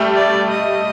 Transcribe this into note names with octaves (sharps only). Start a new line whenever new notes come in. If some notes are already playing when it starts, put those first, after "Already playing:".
Already playing: G3 A3
D5
D#5